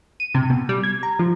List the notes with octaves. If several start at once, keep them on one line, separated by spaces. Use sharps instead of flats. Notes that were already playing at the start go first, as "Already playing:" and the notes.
D#7
C3
B2
G3
G#6
A#5
F3